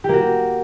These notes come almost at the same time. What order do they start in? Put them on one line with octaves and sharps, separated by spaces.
G4 A#3 F#4